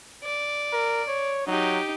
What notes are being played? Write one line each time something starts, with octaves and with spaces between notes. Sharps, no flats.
D5
A#4
C#5
F#3 D#4 G4